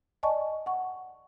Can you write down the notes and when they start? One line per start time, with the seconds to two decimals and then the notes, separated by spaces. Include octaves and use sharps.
0.23 D5 D#5 G#5 A5 C#6
0.66 F#5 C#6